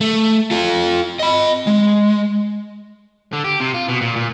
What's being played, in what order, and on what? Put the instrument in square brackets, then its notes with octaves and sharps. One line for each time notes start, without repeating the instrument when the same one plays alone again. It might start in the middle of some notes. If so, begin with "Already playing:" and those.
[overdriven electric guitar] A3
F4 A4
D#5 B5
G#3
[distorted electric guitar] D3
G4
C3
F4
B2
A#2
A#2